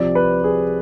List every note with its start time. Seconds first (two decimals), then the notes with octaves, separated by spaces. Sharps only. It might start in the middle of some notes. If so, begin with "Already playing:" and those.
Already playing: C2 C3 F3 D5
0.15 B4
0.44 G#4